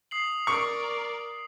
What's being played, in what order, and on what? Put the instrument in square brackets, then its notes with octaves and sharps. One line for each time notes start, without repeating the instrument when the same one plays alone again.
[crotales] D#6 C7 F#7
[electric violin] A#4 D5 [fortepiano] C#6